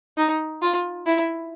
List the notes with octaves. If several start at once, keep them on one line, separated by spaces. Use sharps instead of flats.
D#4
F4
E4